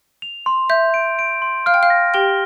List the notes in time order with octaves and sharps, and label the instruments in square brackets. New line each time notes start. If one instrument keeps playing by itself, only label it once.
[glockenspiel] F7
C6
[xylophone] E5 [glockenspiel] G6
[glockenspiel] D7
D7
C6
[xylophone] F5 [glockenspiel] F6
[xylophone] G5
F5
[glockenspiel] A#6
[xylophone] G4 G5 [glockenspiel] G7